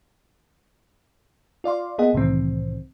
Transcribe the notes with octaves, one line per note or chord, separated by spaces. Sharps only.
F4 D5 F5 C6
A#3 B3 G#4 D#5 F#5
C2 A2 C3 D#3 E3 C4